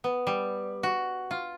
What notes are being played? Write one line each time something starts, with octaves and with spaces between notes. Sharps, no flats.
B3
G3
F#4
F4